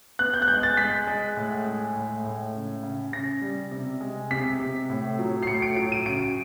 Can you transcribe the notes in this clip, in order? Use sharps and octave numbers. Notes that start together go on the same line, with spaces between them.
B3 F#6
G6
F#6
G#3 G6
A6
G#3 B6
G#3
A2
G#3
A2
A2
C#3
C#3
C#3 A#6
G3
C3
G#3
C3 B6
C3
A2
F#3
C7
A2 C#7
D7
F#3 D7
D#7
C#3 D7